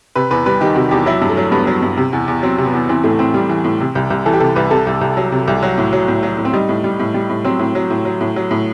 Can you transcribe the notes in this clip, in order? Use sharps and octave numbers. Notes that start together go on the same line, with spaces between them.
C3 B4
E2 B4
G3 B4
D#3 G4
C3 F#4
E2 G4
F#3 E4
G2
A3
F#3
G2 B3
F#3
G2
C3
E2
E2
F#3 C4
C3
B3
E2
E3 C4
A2 A3
A2 C4
G3
E3
A2
C3
C2
C2
E3 A4
G4
C3 A4
C2 B4
C3 A4
C2
C2
F#3
C3
C2
F#3 F#4
A2
F#3
A2
F#3
A2
C4
G3 D#4
A2
G3
A2
G3
A2
F#3 C4
A2
F#3
A2
F#3
A2
F#3
A2